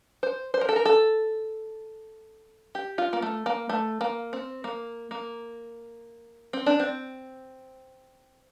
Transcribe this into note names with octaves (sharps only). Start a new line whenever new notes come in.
C5
C5
A#4
A4
A#4
A4
G4
F4
A#3
A3
A#3
A3
A#3
C4
A#3
A#3
C4
D4
C4